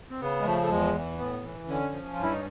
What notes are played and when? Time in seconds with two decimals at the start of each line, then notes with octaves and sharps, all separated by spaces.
0.11 C4
0.21 C#3 B3
0.41 G#3
0.46 F3 A3
0.61 A3
0.71 E2 G#3
0.95 E3
1.19 A2 B3
1.43 E3
1.68 D3 C#4
1.92 F3
2.13 G2 F4
2.23 E4
2.32 D#4